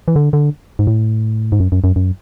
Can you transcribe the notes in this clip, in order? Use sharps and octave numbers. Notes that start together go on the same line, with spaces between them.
E3
D3
D3
G#2
A2
G#2
F#2
F#2
F#2
F#2